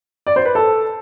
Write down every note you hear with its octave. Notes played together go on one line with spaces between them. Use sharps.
D5
C5
B4
A4